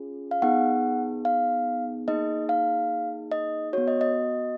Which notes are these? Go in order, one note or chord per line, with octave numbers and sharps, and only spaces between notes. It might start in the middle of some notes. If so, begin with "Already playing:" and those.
Already playing: C#4 F4 G#4
F5
B3 D#4 G#4 F#5
F5
A#3 D#4 G#4 D#5
F5
D#5
B3 F#4 C#5
D#5
D#5